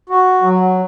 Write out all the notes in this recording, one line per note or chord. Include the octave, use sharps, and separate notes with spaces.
F#4
F#3